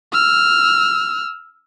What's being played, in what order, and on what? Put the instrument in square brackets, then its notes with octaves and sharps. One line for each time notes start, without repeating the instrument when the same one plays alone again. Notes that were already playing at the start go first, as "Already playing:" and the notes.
[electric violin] E6 F6